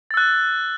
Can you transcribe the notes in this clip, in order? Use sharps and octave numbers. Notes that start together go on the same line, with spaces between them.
E6 F#6 A6